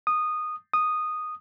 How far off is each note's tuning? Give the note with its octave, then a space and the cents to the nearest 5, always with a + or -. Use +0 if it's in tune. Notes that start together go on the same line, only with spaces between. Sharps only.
D#6 -15
D#6 -10